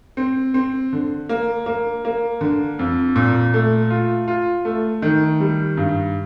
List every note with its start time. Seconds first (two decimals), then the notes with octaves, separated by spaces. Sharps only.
0.17 C4
0.54 C4
0.93 D3
1.29 A#3
1.66 A#3
2.05 A#3
2.41 D3
2.79 F2
3.16 A#2
3.54 A3
3.90 F4
4.28 F4
4.65 A3
5.02 D#3
5.40 G3
5.77 G2